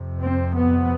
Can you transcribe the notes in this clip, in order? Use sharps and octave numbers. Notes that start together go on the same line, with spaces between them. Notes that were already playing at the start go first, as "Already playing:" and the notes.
Already playing: F2 C3
C4
B3